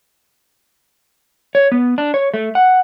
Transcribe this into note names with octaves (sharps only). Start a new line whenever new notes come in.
C#5
B3
D4
C#5
A3
F#5